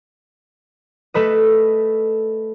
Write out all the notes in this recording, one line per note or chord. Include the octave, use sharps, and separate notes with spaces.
A3 A4 B4 D#5